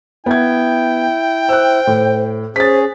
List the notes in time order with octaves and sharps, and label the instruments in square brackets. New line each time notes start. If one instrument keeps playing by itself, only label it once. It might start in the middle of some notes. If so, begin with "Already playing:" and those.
[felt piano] B3 G#6 [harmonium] E4 [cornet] G5
[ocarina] C5 [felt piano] E6 F#6
[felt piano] A2
[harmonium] C#4 G#4 [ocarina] C5 [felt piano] A6 B6